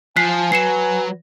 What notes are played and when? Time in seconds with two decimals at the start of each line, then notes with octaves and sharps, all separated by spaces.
0.16 F3 G#5 F#6 B6 C7
0.52 F#3 B4 C7 C#7 E7